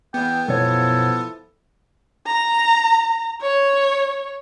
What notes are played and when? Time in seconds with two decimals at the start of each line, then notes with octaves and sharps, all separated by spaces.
0.14 E2 B3 G5
0.48 F#2 B2 F3 E4 A4 C#5
2.26 A#5
3.41 C#5